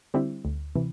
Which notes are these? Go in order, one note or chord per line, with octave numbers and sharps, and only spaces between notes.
D3 G3 C4 E4
D2
C3 E3